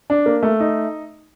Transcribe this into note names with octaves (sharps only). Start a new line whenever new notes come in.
D4
A#3
A3
D#4